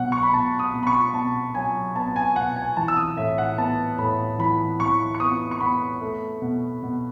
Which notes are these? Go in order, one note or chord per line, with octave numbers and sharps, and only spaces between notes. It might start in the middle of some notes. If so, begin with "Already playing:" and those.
Already playing: B2 F#3 F#5
C#6
B5
B2 A5
D#6
B2
B5
C#6
B2 A5
F#3 G#5
B3 A5
G#5
B2 F#5
G#5
E3 A5
E6
D#6
A2 E5
F#5
B3 A5
A2 B5
E3 B5
E3 C#6
C#6
B3 D#6
C#6
B3 B5
A3
B2
B2